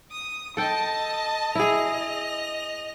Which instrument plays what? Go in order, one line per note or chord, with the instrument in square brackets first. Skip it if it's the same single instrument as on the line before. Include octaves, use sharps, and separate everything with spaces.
[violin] D#6
[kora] A4 G5 [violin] D#5 A5
[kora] E4 G#4 [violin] D#5 F7